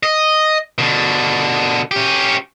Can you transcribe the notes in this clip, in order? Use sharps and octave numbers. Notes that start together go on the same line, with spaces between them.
D#5
B2 D3
C#4 G4